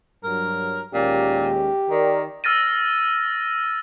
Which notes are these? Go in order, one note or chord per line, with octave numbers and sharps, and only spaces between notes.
G2 F#3 A#4
D#2 A#2 G#3 C#4 G4
D#3 A#4 D5
E6 F6 A6 A#6 D#7